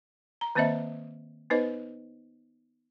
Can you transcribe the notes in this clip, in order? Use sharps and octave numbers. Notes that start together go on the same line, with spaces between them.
A#5
D#3 A#3 C4 C5 D#5 E5
B3 D#4 B4 C5 D#5